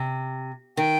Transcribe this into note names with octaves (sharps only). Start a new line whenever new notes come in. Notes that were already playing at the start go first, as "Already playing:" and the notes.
Already playing: C3
D#3 G5